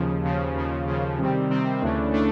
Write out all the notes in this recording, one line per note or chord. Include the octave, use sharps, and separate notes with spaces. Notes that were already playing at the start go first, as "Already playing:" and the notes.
Already playing: D#2 C#3 F3
D#2 C#3 F3
D#2 C#3 F3
D#2 C#3 F3
C3 D#3 G3 C4
C3 D#3 G3 C4
D2 C#3 E3 A3 D4
C#3 E3 A3 D4